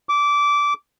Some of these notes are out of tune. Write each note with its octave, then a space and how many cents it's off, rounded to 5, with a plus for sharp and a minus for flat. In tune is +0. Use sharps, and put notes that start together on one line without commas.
D6 -15